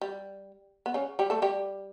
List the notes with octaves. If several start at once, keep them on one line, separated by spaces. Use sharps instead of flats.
G3
B3
C#3 C#4
G3 G4
A3 A4
G3 G4